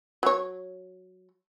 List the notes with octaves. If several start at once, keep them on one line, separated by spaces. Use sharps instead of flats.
F#3 C#5